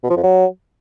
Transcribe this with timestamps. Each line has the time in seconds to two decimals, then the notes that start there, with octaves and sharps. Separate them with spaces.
0.03 B2
0.10 F3
0.17 F2
0.23 F#3